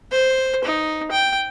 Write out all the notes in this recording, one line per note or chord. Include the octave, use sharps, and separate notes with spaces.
C5
D#4
G5